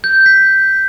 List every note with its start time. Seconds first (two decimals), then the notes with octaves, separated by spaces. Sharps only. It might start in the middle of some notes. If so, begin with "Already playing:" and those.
0.04 G6
0.26 B6